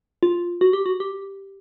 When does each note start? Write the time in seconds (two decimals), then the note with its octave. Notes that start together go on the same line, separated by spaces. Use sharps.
0.23 F4
0.61 F#4
0.73 G4
0.86 F#4
1.00 G4